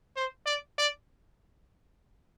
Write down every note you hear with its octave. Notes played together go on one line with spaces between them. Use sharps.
C5
D5
D5